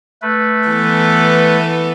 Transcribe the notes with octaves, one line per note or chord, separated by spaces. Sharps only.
A3 B4
E3 B3 A4